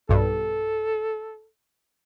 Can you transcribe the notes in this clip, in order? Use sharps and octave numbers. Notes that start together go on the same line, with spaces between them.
B1 G2 A4